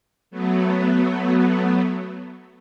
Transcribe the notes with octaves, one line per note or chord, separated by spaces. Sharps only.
F#3 A3 B3